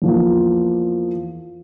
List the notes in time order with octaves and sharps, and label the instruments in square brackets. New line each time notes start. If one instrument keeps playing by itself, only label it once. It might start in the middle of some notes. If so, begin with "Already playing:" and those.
[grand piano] E2 F3 A#3